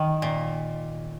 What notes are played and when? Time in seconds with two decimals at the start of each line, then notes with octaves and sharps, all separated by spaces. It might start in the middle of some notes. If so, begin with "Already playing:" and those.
Already playing: D#3
0.22 A#2